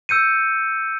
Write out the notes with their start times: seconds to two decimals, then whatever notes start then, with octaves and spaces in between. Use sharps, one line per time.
0.09 E6 G6 C#7 D#7